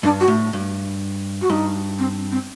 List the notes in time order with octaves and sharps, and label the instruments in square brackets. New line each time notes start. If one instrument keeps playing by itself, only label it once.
[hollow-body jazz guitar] G2 [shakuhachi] D4
[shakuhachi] F#4
[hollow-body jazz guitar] A2
G2
[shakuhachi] F#4
[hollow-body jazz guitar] G2 [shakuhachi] D#4
[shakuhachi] C4
C4